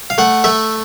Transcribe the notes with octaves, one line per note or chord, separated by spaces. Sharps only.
F5
A3 F#5
A3 E5